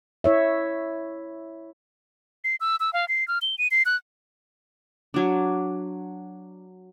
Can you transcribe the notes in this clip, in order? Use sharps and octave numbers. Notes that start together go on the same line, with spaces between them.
E4 C#5 E5
C7
E6
E6
F5
C7
F6
G7
D#7
C7
F#6
F#3 D4